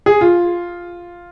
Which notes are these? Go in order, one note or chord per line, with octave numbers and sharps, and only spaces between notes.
G#4
F4